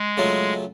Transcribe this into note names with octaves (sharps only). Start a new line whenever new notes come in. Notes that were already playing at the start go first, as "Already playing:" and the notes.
Already playing: G#3
C#3 F#3 A3 C#4 F4